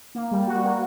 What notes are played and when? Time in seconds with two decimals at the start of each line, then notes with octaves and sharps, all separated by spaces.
0.15 A#3
0.31 G3
0.47 F#4
0.64 A#3